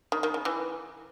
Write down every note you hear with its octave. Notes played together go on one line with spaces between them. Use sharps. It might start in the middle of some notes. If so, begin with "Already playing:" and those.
D#3
D#3
C#3
E3